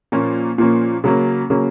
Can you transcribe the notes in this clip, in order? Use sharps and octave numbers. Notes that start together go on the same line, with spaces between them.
A#2 F3 A#3 C#4
A#2 F3 A#3 C#4
C#3 F#3 A#3 C#4
C#3 F#3 A#3 C#4